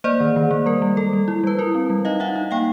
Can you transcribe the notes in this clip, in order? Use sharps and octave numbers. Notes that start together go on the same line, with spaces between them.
A#3 C5 D5
D#3
D#3
A#3
G3 A#4
G3
G3 A4
G3
E4
G3 B4
E4 A#4
C4
G3
D#4 D#5 F5
D#4 E5 F#5
D#4
A#3 F5 G5